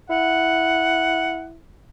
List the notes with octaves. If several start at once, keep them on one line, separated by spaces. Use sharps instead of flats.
E4 F#5